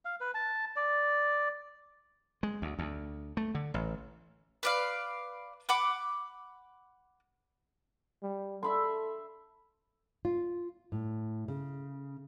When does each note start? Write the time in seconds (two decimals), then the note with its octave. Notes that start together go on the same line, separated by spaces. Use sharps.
0.05 F5
0.21 B4
0.34 A5
0.76 D5
2.43 G#3
2.62 D2
2.79 D2
3.37 A3
3.55 D3
3.74 A1
4.63 B4 D5 F5
5.69 F#5 B5 D6
8.23 G3
8.63 A4 E5 B5 C6
10.25 F4
10.92 A2
11.48 C#3